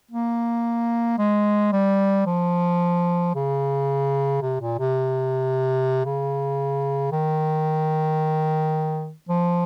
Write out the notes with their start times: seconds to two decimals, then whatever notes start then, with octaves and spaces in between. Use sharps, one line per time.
0.11 A#3
1.18 G#3
1.72 G3
2.26 F3
3.35 C#3
4.42 C3
4.61 A#2
4.79 C3
6.05 C#3
7.12 D#3
9.29 F3